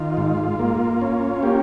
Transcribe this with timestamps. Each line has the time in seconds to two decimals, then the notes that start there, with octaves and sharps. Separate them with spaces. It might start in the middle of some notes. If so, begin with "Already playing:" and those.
Already playing: D#3 F4
0.17 G#2
0.59 A#3
1.02 C#4
1.43 A#3 G4